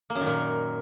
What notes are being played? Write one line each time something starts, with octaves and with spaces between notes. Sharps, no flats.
A#3
F#2
D#3
A#2